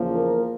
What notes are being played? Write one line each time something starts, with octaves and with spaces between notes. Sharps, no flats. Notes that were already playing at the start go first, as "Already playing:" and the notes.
Already playing: E2 C#3 F3 A#3
A#4